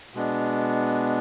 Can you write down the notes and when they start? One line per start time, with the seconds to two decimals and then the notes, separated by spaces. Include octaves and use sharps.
0.14 B2 G#3 B3 D4